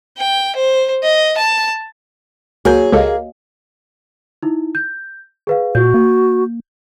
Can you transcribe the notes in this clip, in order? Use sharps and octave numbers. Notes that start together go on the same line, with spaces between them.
G5
C5
D#5
A5
C#2 F#3 A#3 F#4 G#4 A#4 G6
C#2 A#3 G4 A4 C#5 D#5 F5
D#4 E4
G6
G#4 B4 F5
A#2 F#4 G6
A#3